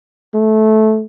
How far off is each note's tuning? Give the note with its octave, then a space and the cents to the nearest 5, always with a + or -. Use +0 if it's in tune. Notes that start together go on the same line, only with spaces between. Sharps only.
A3 -15